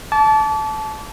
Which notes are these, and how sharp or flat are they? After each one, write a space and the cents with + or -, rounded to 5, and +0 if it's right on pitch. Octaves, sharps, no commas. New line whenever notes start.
A5 -20 D6 -35